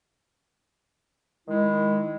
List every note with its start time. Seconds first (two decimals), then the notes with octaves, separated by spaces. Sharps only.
1.48 D#3 G#3 E4